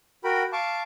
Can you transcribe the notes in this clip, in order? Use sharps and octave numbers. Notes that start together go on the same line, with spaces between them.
F#4 A#4 G5 B5
F5 A5 C#6 D6